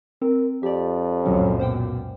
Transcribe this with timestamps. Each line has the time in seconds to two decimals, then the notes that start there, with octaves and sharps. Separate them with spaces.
0.21 C4 A#4
0.63 F2 G4 D5
1.26 C#2 F#2 A#2 F#3 C#4
1.59 B2 C5 F#5 G5